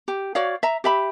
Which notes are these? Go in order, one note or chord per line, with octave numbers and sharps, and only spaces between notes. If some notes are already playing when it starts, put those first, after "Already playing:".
G4
F#4 C#5 D5 F5
E5 A#5
G4 E5 B5